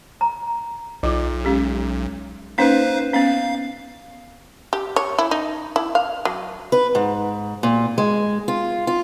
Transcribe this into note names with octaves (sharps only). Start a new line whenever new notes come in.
A#5
B1 F#3 F4
G#3 C#4 G4
A#3 C#4 D#4 B4 C5 F5
B3 C#4 F5
G4
C#5
E4
D#4
E4
F5
F#3
B4
G#2
A#2
G#3
F4
F4